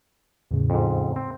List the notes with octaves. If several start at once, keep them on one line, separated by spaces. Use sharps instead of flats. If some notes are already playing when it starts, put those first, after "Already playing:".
E2 A2 C#3
F2 G#2
C4